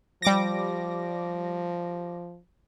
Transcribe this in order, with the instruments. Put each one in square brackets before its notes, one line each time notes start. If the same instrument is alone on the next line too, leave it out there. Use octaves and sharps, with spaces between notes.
[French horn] F3 [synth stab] G3 D6 A#6